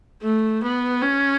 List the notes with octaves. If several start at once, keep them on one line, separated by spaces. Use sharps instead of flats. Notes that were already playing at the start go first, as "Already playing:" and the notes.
A3
B3
C#4